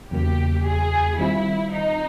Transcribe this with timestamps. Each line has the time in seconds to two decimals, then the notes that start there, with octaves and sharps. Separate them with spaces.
0.10 E2 C#3 F#3 A#3 G4
0.65 G#4
1.17 D#3 G3 C4 E4 F4
1.72 D#4